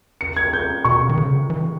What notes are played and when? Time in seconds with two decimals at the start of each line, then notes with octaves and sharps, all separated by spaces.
0.21 C#7
0.37 G#6
0.53 G6
0.84 B2 C#6
1.09 D#3
1.17 C#3
1.50 E3